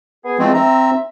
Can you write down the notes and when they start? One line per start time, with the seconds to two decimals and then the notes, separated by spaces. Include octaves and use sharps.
0.24 B3 G#4
0.39 E2 F3 G#3 A3 C4
0.54 C4 E5 A#5